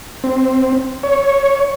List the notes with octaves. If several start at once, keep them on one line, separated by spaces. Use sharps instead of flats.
C4
C#5